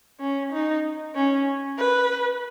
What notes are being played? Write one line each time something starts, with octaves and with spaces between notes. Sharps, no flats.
C#4
D#4
C#4
B4